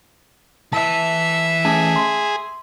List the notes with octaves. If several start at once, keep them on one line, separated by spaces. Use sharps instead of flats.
E3 E4 E5 A5
A3 C#4 G#4 A5
C6